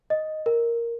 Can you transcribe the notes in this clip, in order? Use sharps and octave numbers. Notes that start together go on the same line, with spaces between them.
D#5
A#4